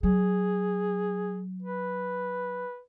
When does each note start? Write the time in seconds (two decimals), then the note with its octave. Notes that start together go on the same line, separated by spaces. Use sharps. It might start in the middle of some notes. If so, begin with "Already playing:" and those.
0.03 F#3 G#4
1.62 B4